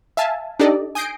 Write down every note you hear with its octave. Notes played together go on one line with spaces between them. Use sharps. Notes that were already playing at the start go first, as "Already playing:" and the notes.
E5 F5 G#5 A5
D4 D#4 G4 A4 D5 D#5
G#5 D#6 G6 A#6 C7 D7